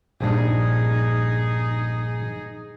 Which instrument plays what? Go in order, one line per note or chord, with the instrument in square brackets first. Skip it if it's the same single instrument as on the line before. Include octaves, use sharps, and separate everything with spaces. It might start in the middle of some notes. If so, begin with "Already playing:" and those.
[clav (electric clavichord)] A#1 G2 D4 [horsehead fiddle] D#4 G#4